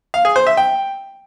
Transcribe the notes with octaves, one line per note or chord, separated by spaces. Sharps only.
F5
G#4
C5
E5
G5